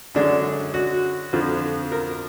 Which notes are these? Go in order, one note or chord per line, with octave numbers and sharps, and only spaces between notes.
F#2 D3 G#3 D4
F#4
F2 D3 F3
A#4